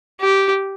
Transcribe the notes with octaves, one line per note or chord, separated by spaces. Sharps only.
G4